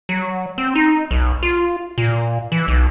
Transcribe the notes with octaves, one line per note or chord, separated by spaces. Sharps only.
F#3
C4
D#4
B1
F4
A#2
E3
B1